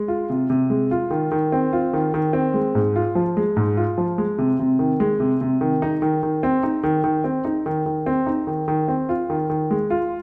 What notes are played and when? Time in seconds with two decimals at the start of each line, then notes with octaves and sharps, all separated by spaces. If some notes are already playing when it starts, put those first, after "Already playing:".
Already playing: G#3
0.08 F4
0.30 C3
0.50 C3
0.70 G#3
0.91 F4
1.10 D#3
1.31 D#3
1.52 C4
1.73 F4
1.93 D#3
2.14 D#3
2.33 C4
2.54 G#3
2.75 G#2
2.96 F4
3.15 F3
3.37 G#3
3.57 G#2
3.77 F4
3.98 F3
4.18 G#3
4.38 C3
4.59 C3
4.79 D#3
5.00 G#3
5.20 C3
5.41 C3
5.61 D#3
5.82 D#4
6.02 D#3
6.23 D#3
6.43 C4
6.63 D#4
6.83 D#3
7.04 D#3
7.24 C4
7.45 D#4
7.66 D#3
7.86 D#3
8.06 C4
8.26 D#4
8.47 D#3
8.68 D#3
8.88 C4
9.09 F4
9.30 D#3
9.50 D#3
9.71 G#3
9.90 F4